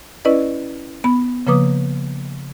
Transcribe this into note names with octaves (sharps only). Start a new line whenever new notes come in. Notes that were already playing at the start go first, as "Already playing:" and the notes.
C#4 E4 B4 D5 D#5
B3 B5
C#3 F3 A#3 B4 D6 D#6